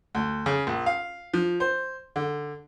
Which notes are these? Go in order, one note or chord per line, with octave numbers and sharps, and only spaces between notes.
D2
C#3
A#1
F5
F3
C5
D3